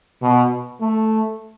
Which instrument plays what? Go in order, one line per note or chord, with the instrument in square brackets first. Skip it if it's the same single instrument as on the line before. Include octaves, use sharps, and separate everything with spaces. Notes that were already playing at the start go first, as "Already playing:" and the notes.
[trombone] B2
A3